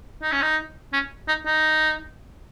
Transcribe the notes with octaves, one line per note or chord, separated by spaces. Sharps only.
D#4
C#4
D#4
C#4
D#4
D#4